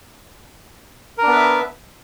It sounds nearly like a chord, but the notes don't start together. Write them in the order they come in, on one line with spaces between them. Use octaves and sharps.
A#4 D4 B3 B4 E5